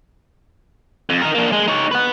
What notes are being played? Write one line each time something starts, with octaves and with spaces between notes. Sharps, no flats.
F2
D#4 A#4
A#3 D4
G#3
D#4 C#5
B4 F#5